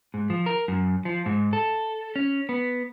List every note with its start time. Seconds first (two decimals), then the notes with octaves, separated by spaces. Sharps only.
0.14 G#2
0.30 F3
0.46 A#4
0.68 F#2
1.05 F3
1.26 G#2
1.53 A4
2.16 C#4
2.49 B3